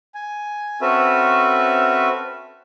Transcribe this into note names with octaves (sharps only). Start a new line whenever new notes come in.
G#5
C4 C#4 F#4 A4 B4 E5